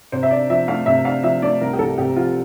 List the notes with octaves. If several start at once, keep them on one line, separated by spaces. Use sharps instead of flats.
C3 C5
E5
D4 D5
F3 E5
A3 F5
C3 E5
D4 F5
F3 E5
A3 D5
C2 A#4
G4
C2 A4
C3 G4
F3 F4